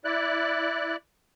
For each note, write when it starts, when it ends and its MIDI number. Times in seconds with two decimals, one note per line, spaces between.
0.05 0.96 64
0.05 0.96 74
0.05 0.96 90